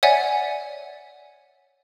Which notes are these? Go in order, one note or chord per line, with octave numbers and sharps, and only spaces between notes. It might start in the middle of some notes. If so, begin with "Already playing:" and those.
C#5 D5 E5 F#5 G#5